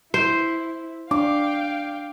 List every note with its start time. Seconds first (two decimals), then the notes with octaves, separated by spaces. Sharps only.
0.14 E4 C5
1.11 D4 F5 G5 D6